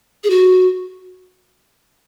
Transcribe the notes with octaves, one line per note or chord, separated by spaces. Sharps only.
G#4
F#4